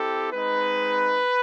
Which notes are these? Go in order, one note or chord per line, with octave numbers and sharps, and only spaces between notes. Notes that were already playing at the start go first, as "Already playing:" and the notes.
Already playing: C4 E4 G4 A4
G#3 C4 D#4 B4